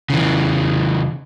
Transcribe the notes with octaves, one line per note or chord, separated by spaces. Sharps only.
C#3 E3